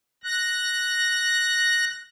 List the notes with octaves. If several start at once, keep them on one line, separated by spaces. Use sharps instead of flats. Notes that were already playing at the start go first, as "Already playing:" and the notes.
F#6 A#6